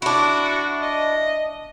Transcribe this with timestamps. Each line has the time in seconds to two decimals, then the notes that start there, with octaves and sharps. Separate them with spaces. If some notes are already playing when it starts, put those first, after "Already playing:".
0.02 D4 E4 F#4
0.82 D#5